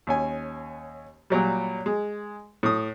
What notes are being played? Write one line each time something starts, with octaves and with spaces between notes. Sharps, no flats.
D#2 C#4 G#5
A#2 F#3 G3
G#3
A2 D#6